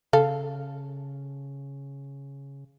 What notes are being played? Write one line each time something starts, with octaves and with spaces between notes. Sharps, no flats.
C#3 A4 F5